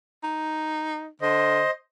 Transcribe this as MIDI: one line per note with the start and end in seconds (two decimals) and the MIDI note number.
0.23 1.08 63
1.22 1.64 50
1.22 1.71 72
1.22 1.71 75